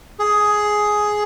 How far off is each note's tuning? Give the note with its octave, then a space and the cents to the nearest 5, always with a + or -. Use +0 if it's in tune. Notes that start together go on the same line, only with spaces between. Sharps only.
G#4 +10